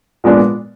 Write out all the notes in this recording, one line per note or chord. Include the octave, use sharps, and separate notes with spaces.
A#2 F3 G#3 B3 D4